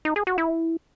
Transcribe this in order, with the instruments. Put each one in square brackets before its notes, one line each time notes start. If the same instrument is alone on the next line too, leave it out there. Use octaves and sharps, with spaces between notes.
[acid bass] D#4
G#4
F#4
E4